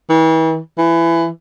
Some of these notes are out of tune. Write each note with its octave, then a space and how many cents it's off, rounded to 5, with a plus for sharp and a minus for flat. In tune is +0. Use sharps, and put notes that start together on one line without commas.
E3 -40
E3 +20